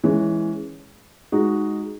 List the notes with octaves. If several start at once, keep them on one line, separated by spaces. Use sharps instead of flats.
E3 G#3 C#4
G#3 D#4 F#4